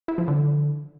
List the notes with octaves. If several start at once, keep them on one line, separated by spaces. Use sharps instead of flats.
E4
F3
D3